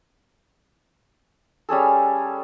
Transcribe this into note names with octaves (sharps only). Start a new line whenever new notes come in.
G3 C#4 G#4 A4